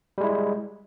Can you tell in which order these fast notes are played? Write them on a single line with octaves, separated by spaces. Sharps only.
G3 G#3 E4